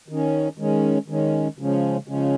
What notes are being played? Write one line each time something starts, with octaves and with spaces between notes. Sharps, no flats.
D#3 C#4
D#3 G#3 C#4
D#3 G#3 C#4
C#3 F3 G#3 C#4
C#3 F3 G#3 C#4